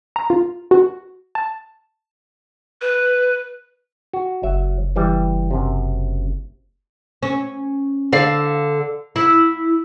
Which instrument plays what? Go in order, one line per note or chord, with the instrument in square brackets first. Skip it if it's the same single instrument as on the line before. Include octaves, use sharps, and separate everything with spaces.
[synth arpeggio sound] A#5
F4
F#4
A5
[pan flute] B4
[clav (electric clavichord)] F#4
[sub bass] F#1 [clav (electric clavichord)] F#3 E5
[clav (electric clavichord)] E3 G3
F#2 C3
[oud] C#4
D3 D5 F5
E4